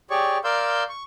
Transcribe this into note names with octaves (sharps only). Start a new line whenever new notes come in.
G4 G#4 C#5 D5 C#6
A#4 D5 F5 C6 E6 G6
C#6